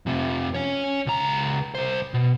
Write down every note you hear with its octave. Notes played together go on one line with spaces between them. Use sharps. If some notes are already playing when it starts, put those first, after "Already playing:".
F2 C3
C#4 C#5
C#2 A#5
C2 C5
B2